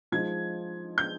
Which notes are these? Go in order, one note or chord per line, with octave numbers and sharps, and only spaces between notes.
F3 G#3 D#4 G#6
G6